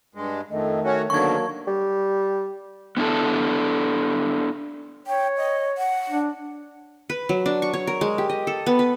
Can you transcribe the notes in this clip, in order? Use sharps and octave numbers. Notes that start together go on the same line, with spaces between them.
G2 G#3
F2 D#3 A3 D#5
C#4 F#4 C#5
B2 D3 D#3 F#3 A#3 D4 C#6 G#6
G3
B3 D4 E4 A4
C#5 G5
D#5
F#5
D4
B4
F#3
D4
C#6
C#5
A#4
G#3
G4
D#5
A4
B3
B4